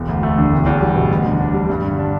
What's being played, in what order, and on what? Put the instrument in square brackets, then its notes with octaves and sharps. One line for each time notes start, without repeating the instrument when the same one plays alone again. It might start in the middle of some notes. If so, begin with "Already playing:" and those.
Already playing: [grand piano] E1
D2
A3
D3
E1
E2
G3
B2
D2
D3
D4
G3
G2
D3
D4